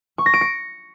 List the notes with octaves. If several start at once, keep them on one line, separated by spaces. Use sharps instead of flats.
C#6
A#6
D7
C#7